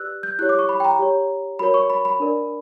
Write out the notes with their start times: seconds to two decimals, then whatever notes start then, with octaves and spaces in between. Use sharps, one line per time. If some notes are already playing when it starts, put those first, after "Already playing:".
Already playing: G4 B4 D5 E6 F#6
0.23 G6
0.39 E4 G4 C#5 F#6
0.49 D6
0.59 C#6
0.69 B5
0.80 G5
0.85 A#5
0.99 G4 C#5
1.59 F#4 A#4 C#5 B5
1.74 C#6
1.90 B5
2.05 B5
2.20 D4 A#4 D5